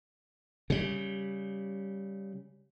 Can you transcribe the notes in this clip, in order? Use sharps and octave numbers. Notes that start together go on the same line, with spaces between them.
C#3 G3